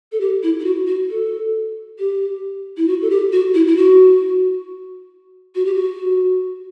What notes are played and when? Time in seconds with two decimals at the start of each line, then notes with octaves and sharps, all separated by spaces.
0.12 A4
0.21 G4
0.43 E4
0.60 E4
0.65 F#4
0.87 F#4
1.10 A4
1.99 G4
2.77 E4
2.88 F#4
3.02 A4
3.10 G4
3.32 F#4
3.54 E4
3.67 E4
3.77 F#4
5.55 F#4
5.66 G4
5.75 F#4